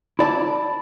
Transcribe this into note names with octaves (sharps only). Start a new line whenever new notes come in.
E4 D5 A5